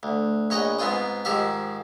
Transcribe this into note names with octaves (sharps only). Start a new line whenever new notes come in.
D2
A#1 C#5 D#5 F#5 G5
G#2 B3 C4 F4 G5 D#6
G#2 D#3 F3 G4 E5 F5